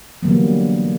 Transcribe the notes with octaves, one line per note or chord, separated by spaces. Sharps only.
D3 E3 F#3 G3 A#3 B3